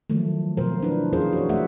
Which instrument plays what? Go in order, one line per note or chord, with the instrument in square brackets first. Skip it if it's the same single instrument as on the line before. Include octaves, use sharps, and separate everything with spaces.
[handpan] D#3 F3 F#3 A3
B2 F3 F4 A#4 C5
D4 E4 B4
E3 C#4 F4 G#4 A#4 C5
F#4 C#5
A3 F#4 D5 E5 F#5